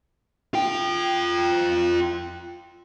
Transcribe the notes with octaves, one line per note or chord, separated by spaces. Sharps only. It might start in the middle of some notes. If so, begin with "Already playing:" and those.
F4 G5